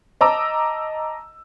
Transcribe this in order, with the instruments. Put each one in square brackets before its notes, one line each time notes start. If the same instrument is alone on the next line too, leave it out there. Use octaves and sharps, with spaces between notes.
[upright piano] D#5 A5 A#5 D6 E6